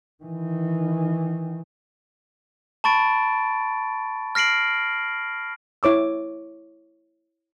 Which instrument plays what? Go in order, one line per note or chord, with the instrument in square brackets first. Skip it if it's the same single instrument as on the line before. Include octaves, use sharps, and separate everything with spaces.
[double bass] D#3 E3
[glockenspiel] A5 B5 C#6 A6 D7
F6 A#6 C7 D7 F#7
[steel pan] E4 C#5 D6 E6